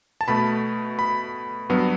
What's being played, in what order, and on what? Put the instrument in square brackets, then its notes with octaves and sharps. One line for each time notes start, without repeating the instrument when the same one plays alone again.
[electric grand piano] A5
B2 A3 B5
B5
G2 F#3 B3